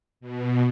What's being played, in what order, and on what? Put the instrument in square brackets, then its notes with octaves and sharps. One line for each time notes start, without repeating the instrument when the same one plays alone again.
[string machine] B2